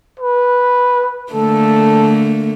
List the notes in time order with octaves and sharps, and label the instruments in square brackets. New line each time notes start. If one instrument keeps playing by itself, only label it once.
[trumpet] B4
[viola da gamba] D3 A3 A#3 [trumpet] A4